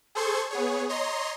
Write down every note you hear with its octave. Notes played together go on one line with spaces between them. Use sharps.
G#4 A4 C5 C6 C#6 G#6
B3 G#4 C#5
C#5 D#5 A#5 C6